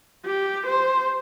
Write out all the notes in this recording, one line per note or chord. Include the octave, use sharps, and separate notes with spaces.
G4
C5